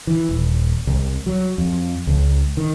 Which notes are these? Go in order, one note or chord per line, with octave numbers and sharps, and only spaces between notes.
E3
D#1
C2
F#3
F2
C#2
D#3